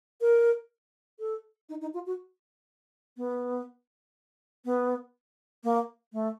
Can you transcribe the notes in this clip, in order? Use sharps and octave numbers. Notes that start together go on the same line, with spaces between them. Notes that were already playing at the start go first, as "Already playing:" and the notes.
A#4
A4
D#4
D#4
F4
F#4
B3
B3
A#3
A3